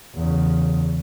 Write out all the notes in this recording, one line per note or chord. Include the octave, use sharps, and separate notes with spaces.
E2 C#3